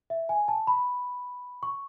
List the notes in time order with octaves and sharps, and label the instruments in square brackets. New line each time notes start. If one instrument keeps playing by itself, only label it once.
[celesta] E5
G#5
A5
B5
C#6